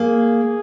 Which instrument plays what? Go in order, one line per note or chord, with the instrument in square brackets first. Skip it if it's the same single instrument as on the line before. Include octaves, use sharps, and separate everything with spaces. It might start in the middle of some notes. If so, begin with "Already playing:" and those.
Already playing: [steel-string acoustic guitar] A#3 [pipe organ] G#4